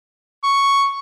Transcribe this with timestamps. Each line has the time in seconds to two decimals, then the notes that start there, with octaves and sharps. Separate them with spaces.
0.43 C#6